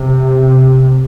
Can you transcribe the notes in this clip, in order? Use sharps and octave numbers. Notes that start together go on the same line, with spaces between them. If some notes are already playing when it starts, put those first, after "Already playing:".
Already playing: C3